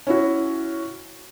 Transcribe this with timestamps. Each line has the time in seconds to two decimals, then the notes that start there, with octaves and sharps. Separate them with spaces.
0.07 C#4 E4 F#4